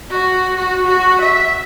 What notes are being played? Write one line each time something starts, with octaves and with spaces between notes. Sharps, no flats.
F#4
F#4
F#4
E5